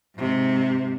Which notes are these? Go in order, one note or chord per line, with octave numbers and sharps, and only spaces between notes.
G#2 C3